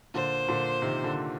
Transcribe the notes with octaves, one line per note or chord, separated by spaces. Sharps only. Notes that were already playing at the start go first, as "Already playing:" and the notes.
A#2 D3 C5
A#2 D3
C3 D#3
A#2 D3